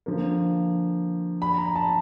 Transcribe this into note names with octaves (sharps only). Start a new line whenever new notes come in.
D3 F3 A#3
B5
A#5
A5